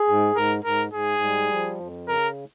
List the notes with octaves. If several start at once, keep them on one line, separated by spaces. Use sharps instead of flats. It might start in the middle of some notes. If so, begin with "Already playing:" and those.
Already playing: G#4
G#2
G#2 A#4
G#2 A#4
G#2 G#4
G3
F3
F2
C#3 A#4